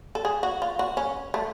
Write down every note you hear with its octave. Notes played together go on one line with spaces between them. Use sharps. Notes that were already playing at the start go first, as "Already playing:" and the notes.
A4
G#4
F#4
F4
F#4
C#4
A3